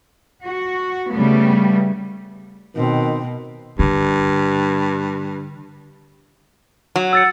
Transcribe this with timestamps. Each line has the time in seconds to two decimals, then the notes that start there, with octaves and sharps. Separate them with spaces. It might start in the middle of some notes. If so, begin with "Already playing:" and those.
0.45 F#4
1.11 C#3 G3 A3 B3
2.76 B2 D#3 C4
3.79 G2 D3
6.96 F#3
7.13 E6 A6 C#7